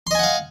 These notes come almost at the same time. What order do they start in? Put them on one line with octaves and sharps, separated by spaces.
C6 D#5 G#5 F#5 F5